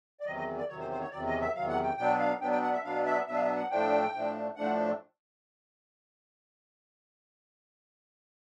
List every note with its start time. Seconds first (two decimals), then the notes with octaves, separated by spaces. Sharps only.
0.20 D5
0.25 E2 C3 D#3 F#3 D#5
0.36 D#5
0.57 D5
0.69 E2 C3 D#3 F#3 C#5
0.79 C5
0.90 C5
1.01 C#5
1.11 E2 C3 D#3 F#3 D5
1.26 D#5
1.41 E5
1.54 E2 C3 D#3 F#3 F5
1.69 F#5
1.83 G5
1.97 B2 F#3 B3 D4 G5
2.19 F5
2.41 B2 F#3 B3 D4 G5
2.51 G5
2.63 F#5
2.73 E5
2.84 B2 F#3 B3 D4 F5
3.05 E5
3.27 B2 F#3 B3 D4 E5
3.36 F5
3.42 E5
3.56 F#5
3.71 A2 F3 A3 D4 G5
4.13 A2 F3 A3 D4
4.56 A2 F3 A3 D4 F#5